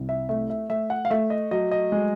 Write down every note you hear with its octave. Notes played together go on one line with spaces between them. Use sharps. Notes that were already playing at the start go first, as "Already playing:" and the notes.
Already playing: C2
E5
A3 E5
E5
A3 E5
F#5
F5
A3 E5
D#5
F#3 D#5
D#5
G#3